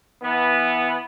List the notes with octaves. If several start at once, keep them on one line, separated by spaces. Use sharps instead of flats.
E3 B3